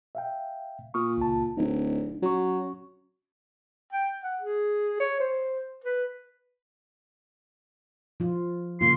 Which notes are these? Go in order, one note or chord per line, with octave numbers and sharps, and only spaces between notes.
E5 F5 G5
A#2 C#6 D#6 F6
C#2 A5
D1 D4 D#4
F#3 C#4 F#4 C#6
G5
F#5
G#4
C#5
C5
B4
F3 F4
C#3 A#3 F4 C6